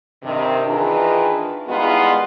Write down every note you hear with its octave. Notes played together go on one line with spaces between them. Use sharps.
G2 C3 D#3
D#3 E3 D4 F4 G#4 B4
D#3 G3 G#3 B3 E4 F4